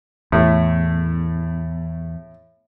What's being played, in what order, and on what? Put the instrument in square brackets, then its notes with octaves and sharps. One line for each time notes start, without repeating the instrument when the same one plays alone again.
[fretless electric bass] E2 [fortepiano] A2 A3